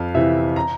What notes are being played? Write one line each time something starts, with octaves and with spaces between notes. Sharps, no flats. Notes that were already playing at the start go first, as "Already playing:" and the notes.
Already playing: F2 F5
C3 E3 E5
A#5